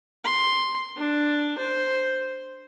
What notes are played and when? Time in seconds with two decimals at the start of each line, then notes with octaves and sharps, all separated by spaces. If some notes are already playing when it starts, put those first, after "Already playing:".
0.24 C6
0.97 D4
1.58 C5